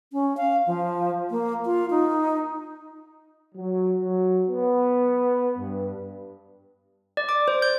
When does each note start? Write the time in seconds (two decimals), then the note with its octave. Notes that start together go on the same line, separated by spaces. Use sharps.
0.13 C#4
0.37 F5
0.67 F3
1.31 A#3
1.65 F4
1.90 D#4
3.55 F#3
4.01 F#3
4.49 B3
5.58 G2
7.17 D5
7.29 D6
7.48 C5
7.62 G6